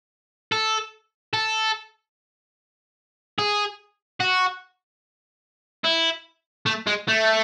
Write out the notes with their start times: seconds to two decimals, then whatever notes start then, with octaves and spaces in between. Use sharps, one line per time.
0.52 A4
1.34 A4
3.39 G#4
4.20 F#4
5.84 E4
6.66 A3
6.87 G#3
7.08 A3